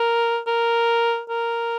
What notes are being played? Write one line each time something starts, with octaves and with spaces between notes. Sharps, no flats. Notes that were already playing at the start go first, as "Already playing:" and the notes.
Already playing: A#4
A#4
A#4